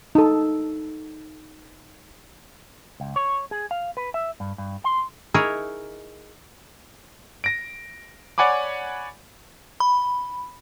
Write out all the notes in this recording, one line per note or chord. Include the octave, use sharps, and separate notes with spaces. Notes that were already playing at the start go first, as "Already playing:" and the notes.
D#4 A4
C#2
C#5
G#4
F5
B4
E5
G2
G2
C6
D#4 E4 G#4 A#4 C#5
A#6 D7
C#5 D5 F#5 G#5 B5 D6
B5